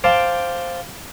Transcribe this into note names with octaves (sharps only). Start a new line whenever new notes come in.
C5 F5 G5 A5 D6